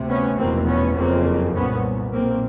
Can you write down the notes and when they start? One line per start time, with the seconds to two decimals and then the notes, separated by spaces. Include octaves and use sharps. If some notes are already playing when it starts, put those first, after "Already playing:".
Already playing: D2 C3
0.09 B3 C#4
0.38 F1 E2 B2 A#3 C4
0.67 B3 C#4
0.96 F#1 F2 C#3 A#3 C4
1.54 C2 A#2 B3 C#4
2.12 B1 A#2 A#3 C4